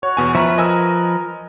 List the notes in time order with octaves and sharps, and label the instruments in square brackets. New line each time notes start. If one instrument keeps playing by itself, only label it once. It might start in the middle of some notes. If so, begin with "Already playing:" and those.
[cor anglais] F#4 [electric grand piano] C#5
[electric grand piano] E2 B2 G#5
[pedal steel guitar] F3 B4 [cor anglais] C#4 [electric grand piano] E5 A#5
[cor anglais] A#4 [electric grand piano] D#5 G#5 E6